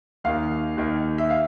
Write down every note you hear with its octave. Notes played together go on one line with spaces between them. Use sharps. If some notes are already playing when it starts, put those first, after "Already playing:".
D#2 D#3 F5
D#2 D#3
E5
F5